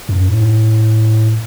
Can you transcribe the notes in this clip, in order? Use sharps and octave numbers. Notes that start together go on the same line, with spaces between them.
F#2
A2